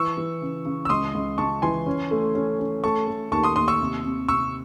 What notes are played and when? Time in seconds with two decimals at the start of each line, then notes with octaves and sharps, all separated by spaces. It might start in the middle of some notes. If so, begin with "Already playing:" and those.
Already playing: E3 C#6 E6
0.17 E3
0.42 C#3
0.65 C#3
0.85 E6
0.89 C#2 C6 D#6
1.14 C#2
1.38 C#2 A5 C#6
1.62 E3 G#5 C6
1.86 C#4
2.11 A3
2.35 C#4
2.59 C#4
2.83 A3 A5 C#6
3.07 A3
3.32 D#2 A5 C#6
3.43 C6 D#6
3.56 D#2 C6 D#6
3.68 C#6 E6
3.81 C3
4.05 C3
4.28 C3 C#6 E6